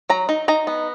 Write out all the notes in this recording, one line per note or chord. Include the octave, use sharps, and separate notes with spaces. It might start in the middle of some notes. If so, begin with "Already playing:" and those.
F#3 A#5
D#4
D#4 A#5
B3